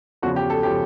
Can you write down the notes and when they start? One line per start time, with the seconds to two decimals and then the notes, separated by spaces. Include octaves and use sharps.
0.22 E2 C#3 F3 F#4
0.36 G4
0.50 A4
0.63 C#3 F3 G4